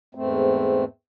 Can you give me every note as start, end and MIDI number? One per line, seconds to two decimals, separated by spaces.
0.15 0.85 40
0.15 0.85 44
0.15 0.85 57
0.15 0.85 60